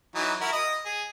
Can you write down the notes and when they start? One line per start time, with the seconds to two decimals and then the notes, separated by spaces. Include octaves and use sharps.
0.15 E3 F#3 D#4
0.41 E4 F#4 A#4
0.52 D#5 D#6
0.85 G#4